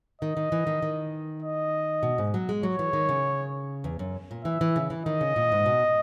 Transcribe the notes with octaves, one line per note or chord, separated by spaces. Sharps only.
D#3 D#5
D#3
E3
D#3
D#3
D#5
B2
G#2
F#3
G#3
F#3 C#5
E3
D#3
C#3
E2
F#2
A#2
E3 E5
E3
C#3
E3
D#3 D#5
C#3
A#2
G#2
B2